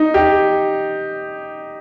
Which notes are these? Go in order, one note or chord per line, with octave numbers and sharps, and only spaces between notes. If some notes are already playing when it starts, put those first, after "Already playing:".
Already playing: D#4
G4